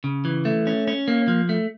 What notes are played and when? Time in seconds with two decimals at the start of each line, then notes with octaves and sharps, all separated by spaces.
0.04 C#3
0.25 E3
0.45 A3
0.67 C#4
0.88 C#4
1.08 A#3
1.28 F3
1.49 A3